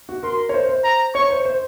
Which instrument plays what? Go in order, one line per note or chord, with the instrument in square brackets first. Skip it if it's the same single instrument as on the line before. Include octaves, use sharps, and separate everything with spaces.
[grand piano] F#4
[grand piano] A#4 [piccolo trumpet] C6
[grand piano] C#5
C5
C5
[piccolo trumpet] A#5
[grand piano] C#5 [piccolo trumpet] C#6
[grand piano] C5
C5